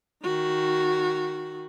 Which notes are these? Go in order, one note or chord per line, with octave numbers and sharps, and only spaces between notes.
D#3 F#4